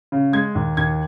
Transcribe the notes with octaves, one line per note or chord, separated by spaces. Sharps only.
C#3
G#3 G#6
D#2
D#2 G#6